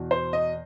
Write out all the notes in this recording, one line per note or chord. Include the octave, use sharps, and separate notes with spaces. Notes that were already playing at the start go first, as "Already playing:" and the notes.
Already playing: E2 B2
C5
D#5